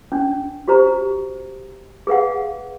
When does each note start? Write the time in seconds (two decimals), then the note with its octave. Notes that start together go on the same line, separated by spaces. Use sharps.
0.12 C#4 D4
0.68 F#4 G4 C5 A#5
2.07 G#4 B4 F5 F#5